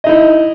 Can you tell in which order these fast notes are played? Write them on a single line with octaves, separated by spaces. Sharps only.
D#5 D#4 E4